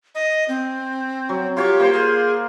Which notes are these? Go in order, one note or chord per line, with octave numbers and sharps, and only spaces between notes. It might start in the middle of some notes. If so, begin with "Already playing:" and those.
D#5
C4
F#3
F4 G4 C#5
A#3 C5 C6
G#4